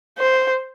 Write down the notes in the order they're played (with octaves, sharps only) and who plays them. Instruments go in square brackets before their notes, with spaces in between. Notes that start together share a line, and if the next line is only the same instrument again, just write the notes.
[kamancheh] C5